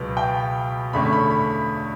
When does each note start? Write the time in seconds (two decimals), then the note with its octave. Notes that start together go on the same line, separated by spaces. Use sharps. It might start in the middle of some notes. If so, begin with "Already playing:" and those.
Already playing: C#2 B2 F#3 B3
0.17 G5
0.93 E2 D3 A3 C#4 B5
1.13 B5
1.30 B5